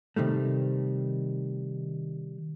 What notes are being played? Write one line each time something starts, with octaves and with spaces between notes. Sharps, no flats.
C3 D#3 G3 A3